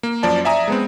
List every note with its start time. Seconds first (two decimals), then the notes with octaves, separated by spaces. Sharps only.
0.03 A#3
0.23 F#2 F3 D5 A5
0.45 D5 E5 G#5 A#5 D#6
0.68 G#3 B3 C4